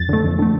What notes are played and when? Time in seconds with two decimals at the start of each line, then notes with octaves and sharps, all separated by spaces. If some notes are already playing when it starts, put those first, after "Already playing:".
Already playing: F2 A6
0.09 D3 A3
0.24 F2
0.39 D3 A3